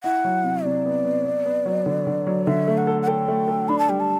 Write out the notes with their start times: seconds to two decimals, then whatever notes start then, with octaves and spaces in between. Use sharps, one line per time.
0.03 E4 F#5
0.24 F#3
0.44 C3
0.64 C3 D5
0.85 B3
1.05 B3
1.25 B3
1.46 B3
1.65 F#3
1.86 D3
2.07 D3
2.27 F#3
2.47 D3 E5
2.68 A3
2.78 F#5
2.87 A4
3.02 F#5
3.08 A4 G5
3.28 A3
3.48 A4
3.68 D4 B5
3.79 A5
3.89 G3 G5
4.00 A5